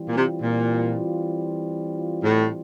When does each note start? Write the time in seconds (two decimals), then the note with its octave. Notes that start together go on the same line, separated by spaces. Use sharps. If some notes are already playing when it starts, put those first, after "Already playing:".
Already playing: E3 G3 C4 F4
0.09 A#2
0.16 C3
0.42 A#2
2.23 A2